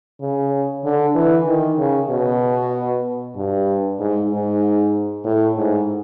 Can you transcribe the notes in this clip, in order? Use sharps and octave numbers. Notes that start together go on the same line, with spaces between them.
C#3
D3
E3
D#3
C#3
B2
G2
G#2
G#2
A2
G#2